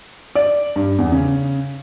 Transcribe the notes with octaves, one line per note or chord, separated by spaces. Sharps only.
D5
G2
E2
C#3